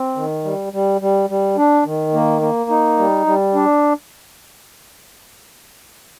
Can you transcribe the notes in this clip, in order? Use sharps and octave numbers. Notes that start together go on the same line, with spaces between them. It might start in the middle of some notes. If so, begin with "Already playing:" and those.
Already playing: C4
D#3
G3
G3
G3
G3
D4
D#3
A#3
A#3
D#4
G3
G3
D4